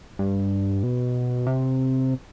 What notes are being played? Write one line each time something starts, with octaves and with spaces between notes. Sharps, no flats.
G2
B2
C3